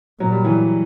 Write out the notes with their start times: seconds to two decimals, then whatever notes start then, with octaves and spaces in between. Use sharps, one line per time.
0.20 A#2 F#3
0.32 G3
0.44 E3 F#3